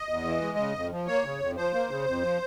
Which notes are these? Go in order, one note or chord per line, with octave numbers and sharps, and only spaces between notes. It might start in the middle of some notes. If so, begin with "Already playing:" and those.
Already playing: D#5
E2
E3
G#3
C#3
F2
F3
A#3 C#5
C#3
F2
F3 C5
A#3
C#3
F2
F3